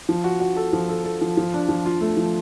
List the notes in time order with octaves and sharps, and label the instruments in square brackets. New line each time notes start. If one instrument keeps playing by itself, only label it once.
[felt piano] F3
F#4
F#4
A4
F3
A4
A4
F3
F3
D4
F3
F4
A3
F3